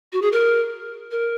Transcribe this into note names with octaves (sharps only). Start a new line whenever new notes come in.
F#4
G#4
A#4
A#4